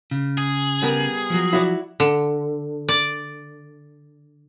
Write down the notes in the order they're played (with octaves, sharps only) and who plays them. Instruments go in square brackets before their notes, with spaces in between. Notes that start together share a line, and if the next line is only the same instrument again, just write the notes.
[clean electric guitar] C#3
[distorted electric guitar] G#4
[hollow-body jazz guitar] G3 B3 A#4
[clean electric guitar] F3 F#3
[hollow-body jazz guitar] E4 F#4 D5
[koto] D3
D5